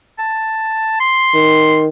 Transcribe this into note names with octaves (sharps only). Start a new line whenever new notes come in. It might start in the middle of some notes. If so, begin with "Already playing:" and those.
A5
C6
D#3